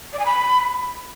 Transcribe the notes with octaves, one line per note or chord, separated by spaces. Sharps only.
D5
G#5
B5